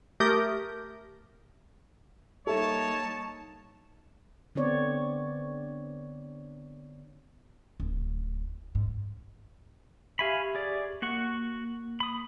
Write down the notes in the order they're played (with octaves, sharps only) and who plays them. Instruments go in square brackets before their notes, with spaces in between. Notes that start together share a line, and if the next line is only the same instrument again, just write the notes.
[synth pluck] A3 G4 A#4 D#6 G6
[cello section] G3 A#3 D#4 [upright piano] A4 E5 [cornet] C#5 [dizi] A5
[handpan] D3 B3 C4 C#5 D5
[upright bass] D1
G#2
[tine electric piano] G4 E5 C#6 [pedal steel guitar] F5 G#5 B5
[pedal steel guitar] G#4 D5
[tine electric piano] A#3 [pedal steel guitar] F#4 F#5 C#6
[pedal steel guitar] B5 D#6